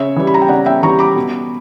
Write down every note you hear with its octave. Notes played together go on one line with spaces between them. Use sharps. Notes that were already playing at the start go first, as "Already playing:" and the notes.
Already playing: C#3 C#5 E5
E3 G3
B5
A#5
G5
C#3 D5 F#5
E5 G5
E3 G3 A#5 C#6
B5 D6
B2